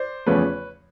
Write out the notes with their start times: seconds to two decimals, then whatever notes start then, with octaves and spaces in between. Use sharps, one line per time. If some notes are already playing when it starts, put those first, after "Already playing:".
Already playing: C5 D5
0.26 E2 C#3 F3 A3 B4 C#5